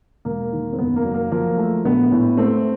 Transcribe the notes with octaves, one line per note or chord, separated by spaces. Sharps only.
E1 A#3
D#3
C4
F#1 B3
A#3
F#3
A#3
F3 A#3
A3
A#1 B3
A2
A3 C4